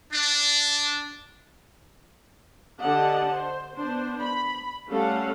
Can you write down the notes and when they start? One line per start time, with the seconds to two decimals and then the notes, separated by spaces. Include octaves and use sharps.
0.12 D4
2.80 D3 G4 D5 D#5 F#5 A5
3.32 C5
3.76 B3 D4 C5
4.22 B5
4.89 G3 A3 C#4 A4 F5 F#5